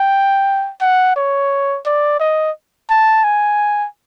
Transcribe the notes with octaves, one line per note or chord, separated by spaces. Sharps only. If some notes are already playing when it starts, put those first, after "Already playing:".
Already playing: G5
F#5
C#5
D5
D#5
A5
G#5